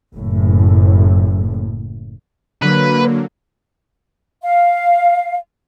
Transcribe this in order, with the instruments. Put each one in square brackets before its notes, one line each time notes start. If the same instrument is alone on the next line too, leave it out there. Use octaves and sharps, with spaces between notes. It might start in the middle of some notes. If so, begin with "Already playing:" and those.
[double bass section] F#1 A2
[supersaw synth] D3 F#3 A#3 [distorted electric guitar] B4
[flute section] F5